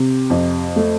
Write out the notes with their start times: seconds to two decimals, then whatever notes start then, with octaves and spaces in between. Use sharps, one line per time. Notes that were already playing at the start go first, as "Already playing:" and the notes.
Already playing: C3
0.30 F2
0.76 A3